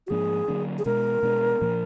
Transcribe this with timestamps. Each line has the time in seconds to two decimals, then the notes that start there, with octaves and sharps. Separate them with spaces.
0.07 F#4
0.10 G#2 F3 A#3 D4 G#4
0.48 D3 F#3 A#3 D4
0.79 G#4
0.85 B2 G#3 D4 A#4
1.23 B2 G#3 B3 D4
1.62 A#2 F3 A#3 D4